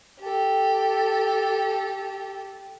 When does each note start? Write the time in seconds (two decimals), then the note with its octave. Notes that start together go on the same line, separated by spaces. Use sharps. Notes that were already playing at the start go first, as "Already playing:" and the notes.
0.21 G4 A4